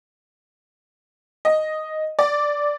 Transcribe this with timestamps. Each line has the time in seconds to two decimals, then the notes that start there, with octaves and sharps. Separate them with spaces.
1.45 D#5
2.19 D5